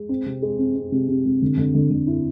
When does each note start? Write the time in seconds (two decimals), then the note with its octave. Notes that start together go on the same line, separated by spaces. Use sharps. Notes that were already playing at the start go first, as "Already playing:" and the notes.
Already playing: G#3
0.09 C4
0.26 C3
0.42 G#3
0.59 C4
0.75 C4
0.92 C3
1.09 C3
1.26 C3
1.42 D3
1.57 D3
1.74 D3
1.90 D3
2.07 E4